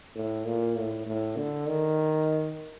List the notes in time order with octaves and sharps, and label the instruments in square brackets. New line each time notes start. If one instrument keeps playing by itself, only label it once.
[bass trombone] A2
A#2
A2
A2
D3
D#3